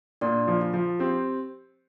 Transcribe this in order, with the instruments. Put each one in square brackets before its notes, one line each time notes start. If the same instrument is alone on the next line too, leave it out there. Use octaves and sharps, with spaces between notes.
[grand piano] A#2 [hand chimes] D4 D5
[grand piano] F3
[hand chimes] F4
[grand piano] F3
[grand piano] C4 [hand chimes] G4